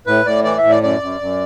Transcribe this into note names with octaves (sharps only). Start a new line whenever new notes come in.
A2 B4
A2 D5
E3 D5
E5
A2
D5
F#2 D5
F#2
F#2